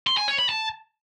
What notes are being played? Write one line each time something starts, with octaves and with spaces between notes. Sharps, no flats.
C6
G#5
C#5
B5
A5